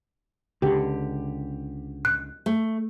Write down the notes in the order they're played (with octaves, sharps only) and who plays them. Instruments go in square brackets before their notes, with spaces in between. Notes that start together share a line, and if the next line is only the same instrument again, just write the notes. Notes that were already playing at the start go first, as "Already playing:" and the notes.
[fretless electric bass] C#2 D3 [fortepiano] G4
[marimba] F#6
[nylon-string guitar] A3